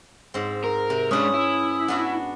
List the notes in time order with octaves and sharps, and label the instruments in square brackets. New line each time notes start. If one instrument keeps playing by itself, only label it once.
[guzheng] G#2 C4
[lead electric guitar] A#4
[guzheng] C3
[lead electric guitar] G#3 D4 [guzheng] C#4 B4 [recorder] D#6
[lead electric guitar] E4
[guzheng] B3 D4 F#4